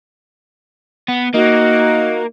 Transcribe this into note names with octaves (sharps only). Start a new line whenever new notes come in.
B3
A#3 D#4 F#4